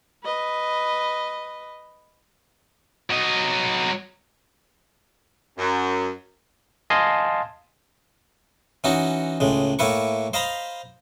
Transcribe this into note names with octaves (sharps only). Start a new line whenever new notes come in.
B4 D#5
F#3 D#5
F#2
D#5 F5 G#5 A5 C6
E3 C#4 D#4 F#4
C#2 A2 G#3
A2 A#3 E4 B4 C#6
C5 D#5 F5 A#5 B5